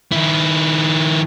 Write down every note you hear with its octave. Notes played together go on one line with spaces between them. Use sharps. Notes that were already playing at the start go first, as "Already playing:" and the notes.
D#3 E4